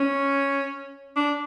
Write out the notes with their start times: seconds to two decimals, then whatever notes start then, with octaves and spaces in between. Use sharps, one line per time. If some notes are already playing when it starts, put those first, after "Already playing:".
Already playing: C#4
1.16 D4